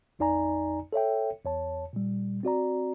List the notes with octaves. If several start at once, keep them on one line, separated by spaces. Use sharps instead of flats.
A1 F2 D#4 D5 G#5 A#5
A4 C#5 E5 G5
E2 C#5 A5
A#2 G3
C4 F#4 D5 A#5